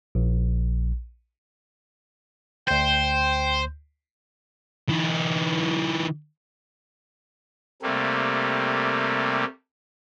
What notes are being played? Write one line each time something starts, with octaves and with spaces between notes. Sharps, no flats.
A#1
D2 C5 G5 G6
E3 D#4
C3 G3 A3 A#3